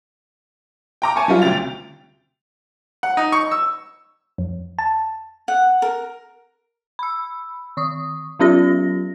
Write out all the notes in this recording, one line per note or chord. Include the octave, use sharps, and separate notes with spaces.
G5 A#5 D6
C#5 G#5 A5 C#6
F#3 G3 F4
D2 C3 G5 A6 F7
F#5
D#4
C#6
E6
F2
A5
F#5
A#4
B5 E6
D#3 C#6 D#6
F#3 B3 C#4 F4 G4 A#6